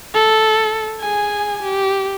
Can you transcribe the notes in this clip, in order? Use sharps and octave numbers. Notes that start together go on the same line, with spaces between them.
A4
G#4 G#5
G4